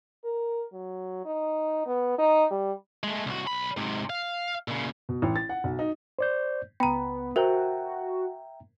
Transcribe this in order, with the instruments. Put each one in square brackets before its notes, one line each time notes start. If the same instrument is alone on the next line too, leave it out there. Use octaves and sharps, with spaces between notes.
[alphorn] A#4
F#3
D#4
B3
D#4
G3
[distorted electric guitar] G#3 A3
C2 F#4
B1 B5
G#2 C3
F5
A#2 C#3
[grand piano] B2
A1
A6
F#5
B1
D#4
[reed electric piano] C5 D5 G6
[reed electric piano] C#2 B5 [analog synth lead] B3 [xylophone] G5 A#5
[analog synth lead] F#4 [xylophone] A#4 C5 [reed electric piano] E5 G5 A#5